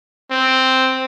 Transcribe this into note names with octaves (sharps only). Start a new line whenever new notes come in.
C4